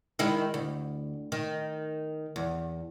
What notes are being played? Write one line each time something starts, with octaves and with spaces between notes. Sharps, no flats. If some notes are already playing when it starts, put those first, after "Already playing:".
D#3 G#3 E4
D2
D#3
E2